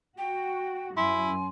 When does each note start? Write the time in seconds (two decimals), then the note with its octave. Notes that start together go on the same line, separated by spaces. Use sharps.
0.18 F#4 G5
0.97 F#2 E4 G#5 C6